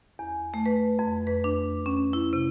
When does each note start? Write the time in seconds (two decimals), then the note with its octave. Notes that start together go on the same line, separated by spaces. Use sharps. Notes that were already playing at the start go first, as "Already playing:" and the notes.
0.19 E2
0.54 A3
0.66 B4
0.99 F2
1.27 B4
1.44 D4
1.86 C#4
2.13 E4
2.33 C3